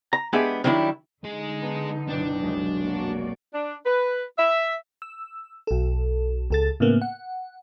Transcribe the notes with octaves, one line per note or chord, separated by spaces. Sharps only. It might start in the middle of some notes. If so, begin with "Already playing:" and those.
A#5
G#3 B3 D4 G4 G#4 E5
D#3 F#3 G3 D4 E4
D3 G#3 D#4 G#4
B3 A5 C7
F#1 B2 D4 G5
F1 B1 G#3
A#3 F#4 D5
D4
B4
E5
E6
B1 A4
C#2 A4 A6
A2 C#3 A#3 B3
F#5